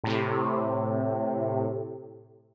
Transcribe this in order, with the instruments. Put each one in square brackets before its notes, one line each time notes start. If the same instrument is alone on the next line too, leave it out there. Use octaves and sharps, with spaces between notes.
[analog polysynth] A2 C3